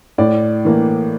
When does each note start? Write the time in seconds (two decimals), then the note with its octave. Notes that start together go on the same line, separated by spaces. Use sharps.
0.18 A2 D5
0.65 E3 A#3